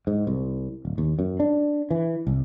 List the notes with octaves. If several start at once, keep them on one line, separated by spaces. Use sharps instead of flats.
G#2
C2
D1
D#2
F#2
D4
E3
C2